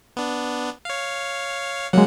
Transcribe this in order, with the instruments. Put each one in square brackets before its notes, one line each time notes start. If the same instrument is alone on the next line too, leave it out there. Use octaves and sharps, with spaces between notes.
[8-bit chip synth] B3 D4
C#5 F5
[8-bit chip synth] C#3 A#3 F#5 [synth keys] F#3 G#3